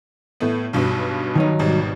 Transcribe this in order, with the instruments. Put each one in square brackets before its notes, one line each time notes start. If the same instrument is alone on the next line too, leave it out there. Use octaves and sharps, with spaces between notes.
[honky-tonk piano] A2 A3 B3
B1 G2 B2
[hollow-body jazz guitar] D#3 F#3 D#4
[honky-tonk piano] G#1 B2 G3